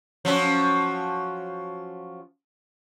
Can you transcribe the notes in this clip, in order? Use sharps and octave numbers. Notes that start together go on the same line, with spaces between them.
F3 F#3 C#4